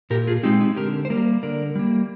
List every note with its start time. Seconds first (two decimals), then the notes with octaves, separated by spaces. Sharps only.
0.10 A#2 G4 A#4
0.27 F4 G#4
0.43 G#3 C4 D#4 G4
0.60 D#4
0.77 D3 G4 A#4
1.05 C5
1.10 G3 A#3 G4 A#4
1.43 D3 A#4 D5
1.76 G3 A#3